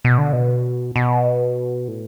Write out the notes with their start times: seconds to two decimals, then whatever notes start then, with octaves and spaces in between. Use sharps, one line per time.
0.04 B2
0.18 D3
0.33 B2
0.96 B2
1.88 A2